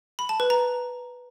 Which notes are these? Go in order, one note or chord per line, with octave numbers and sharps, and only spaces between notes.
B5
A5
B4
A#5